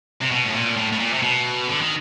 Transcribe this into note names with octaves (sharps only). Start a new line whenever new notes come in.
C3
B2
A2
A#2
A2
A2
A#2
C3
B2
D3
D#3